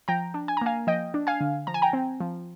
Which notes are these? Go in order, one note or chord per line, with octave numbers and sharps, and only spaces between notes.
F3 G5 A#5
D4
G#5
A#5
A#3 F5 G#5
F3 D#5 G5
D4
F5 G#5
D3
F3 A#5
G#5
G5 A#5
C4
F3